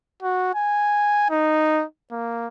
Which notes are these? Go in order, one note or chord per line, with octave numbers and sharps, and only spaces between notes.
F#4
G#5
D#4
A#3